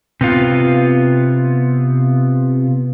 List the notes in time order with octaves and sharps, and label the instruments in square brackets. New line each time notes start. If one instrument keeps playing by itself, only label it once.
[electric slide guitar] C3 B3 F4